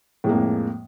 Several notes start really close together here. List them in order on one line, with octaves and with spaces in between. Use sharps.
A2 G#3 A#3 F2